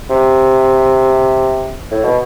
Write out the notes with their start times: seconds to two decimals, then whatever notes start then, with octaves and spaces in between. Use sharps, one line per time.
0.10 C3
1.91 A2
2.04 B2